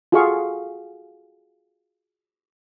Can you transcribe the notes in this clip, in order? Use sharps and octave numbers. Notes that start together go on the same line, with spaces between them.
F4 F#4 G#4 A4 F5 C#6